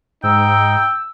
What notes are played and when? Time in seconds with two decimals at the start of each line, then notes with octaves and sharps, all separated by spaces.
0.24 G#2 D#4 G5 E6